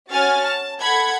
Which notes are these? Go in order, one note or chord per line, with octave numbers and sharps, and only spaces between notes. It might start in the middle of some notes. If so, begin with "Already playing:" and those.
C#4 F#4 G#5 F6 A6
A5
A4 F#5 B5 G#6